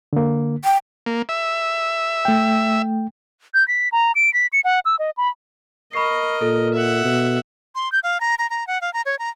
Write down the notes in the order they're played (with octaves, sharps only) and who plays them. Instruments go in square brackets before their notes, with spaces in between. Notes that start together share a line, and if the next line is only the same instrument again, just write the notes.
[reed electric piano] D3 A#3
[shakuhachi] G5
[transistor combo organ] A#3
E5
[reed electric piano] A3 G5
[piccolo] G6
B6
A#5
D7
B6
C#7
F#5
E6
D#5
B5
[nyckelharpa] A#4 D#5 [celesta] B5 C#6 C7
[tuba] A#2 [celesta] A4
[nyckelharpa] E5 F#5
[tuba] B2
[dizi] C6
G6
F5
A#5
A#5
A#5
F#5
F5
A#5
C#5
A#5